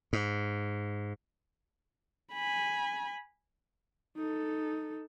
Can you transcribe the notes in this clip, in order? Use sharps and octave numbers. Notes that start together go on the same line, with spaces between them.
G#2
G#5 B5
D#4 A4